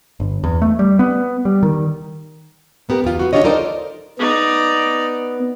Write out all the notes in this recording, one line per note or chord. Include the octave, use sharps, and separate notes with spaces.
G1
E2
A3
G3
B3
G3
D#3
A#3 B3 G4 A#4
E2 F4
B3 F#4
D4 E4 F4 G4 C#5 D#5
D#4 A4 A#4 C5 D5 D#5
B3 D#4 D5